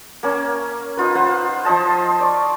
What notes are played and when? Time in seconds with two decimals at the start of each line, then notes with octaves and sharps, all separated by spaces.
0.23 A#3 C#4
0.97 D#4 F4 B4
1.15 F4 C5 F#5
1.65 F3 C5 D#5 A5
2.20 D5 C#6